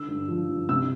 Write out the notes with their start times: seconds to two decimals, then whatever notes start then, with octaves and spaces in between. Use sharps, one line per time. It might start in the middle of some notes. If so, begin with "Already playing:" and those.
Already playing: D3 E6
0.08 G2
0.28 F3
0.49 G2
0.69 C3 E6